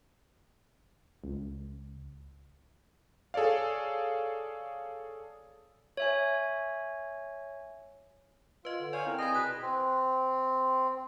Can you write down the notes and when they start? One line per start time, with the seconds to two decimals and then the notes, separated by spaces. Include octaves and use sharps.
1.24 C#2
3.34 G#4 A4 C#5 D5 F5
5.97 C#5 E5 G#5
8.65 F4 B4 D#5
8.80 D3
8.93 C#5 D5 F5 G#5
9.06 C4 E4 A#4
9.19 G#4 D#5 A5 B5
9.34 B2 B4 F#6
9.62 C4